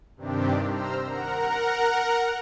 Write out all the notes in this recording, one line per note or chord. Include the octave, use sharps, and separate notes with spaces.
G2 C3 D#3 C4 D4 G4
C5 A#5 E6 F6
A#4 F#5 A#5